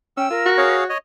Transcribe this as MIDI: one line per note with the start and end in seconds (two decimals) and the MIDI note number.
0.17 0.27 61
0.17 0.29 79
0.17 0.49 88
0.30 0.47 65
0.30 0.76 70
0.46 0.88 66
0.58 0.84 68
0.58 0.85 73
0.58 0.84 77
0.89 0.98 73
0.89 0.98 75